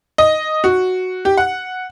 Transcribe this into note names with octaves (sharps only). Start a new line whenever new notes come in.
D#5
F#4
G4
F#5